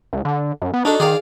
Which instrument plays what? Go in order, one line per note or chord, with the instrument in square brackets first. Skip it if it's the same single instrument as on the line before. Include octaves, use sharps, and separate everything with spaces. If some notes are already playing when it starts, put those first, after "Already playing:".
[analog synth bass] C#2
D3
F#2
B3
[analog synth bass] D4 [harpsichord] D#4 F#4 A4
[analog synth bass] D#3 [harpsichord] G#4 D5 F5